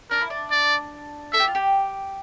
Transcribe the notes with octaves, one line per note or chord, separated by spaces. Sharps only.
D4 A#4
E4
D4
D5
A4 E5
G4
F4
G4